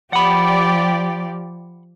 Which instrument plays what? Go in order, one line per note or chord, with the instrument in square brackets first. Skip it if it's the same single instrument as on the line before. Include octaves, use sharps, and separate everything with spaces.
[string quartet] F3 [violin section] G4 D5 [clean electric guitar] F#5 B5